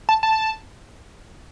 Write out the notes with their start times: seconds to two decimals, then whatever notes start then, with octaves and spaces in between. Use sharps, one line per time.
0.09 A5
0.23 A5